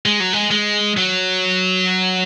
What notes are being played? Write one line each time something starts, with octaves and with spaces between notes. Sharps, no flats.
G#3
F#3
G#3
G#3
F#3